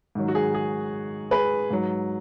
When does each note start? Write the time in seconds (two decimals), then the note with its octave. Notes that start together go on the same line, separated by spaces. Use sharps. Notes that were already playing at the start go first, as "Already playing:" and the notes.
0.15 G#2 D#3 F#3
0.28 F#4
0.35 G#4
0.55 G#4
1.31 G#4 B4
1.70 G#2 F#3